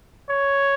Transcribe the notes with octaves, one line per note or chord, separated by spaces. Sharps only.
C#5